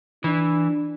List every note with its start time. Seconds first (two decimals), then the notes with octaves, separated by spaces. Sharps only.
0.24 E3 D4